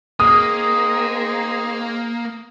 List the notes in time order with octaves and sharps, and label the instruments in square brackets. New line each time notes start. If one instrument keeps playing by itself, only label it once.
[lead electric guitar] A#3 [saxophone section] C4 D#4 G#4 [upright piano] D#6